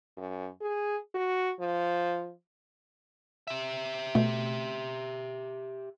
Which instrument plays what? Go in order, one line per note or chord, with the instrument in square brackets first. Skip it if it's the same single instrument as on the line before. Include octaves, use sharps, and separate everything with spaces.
[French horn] F#2
G#4
F#4
F3
[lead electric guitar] G4 E5
[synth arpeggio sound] B2 A3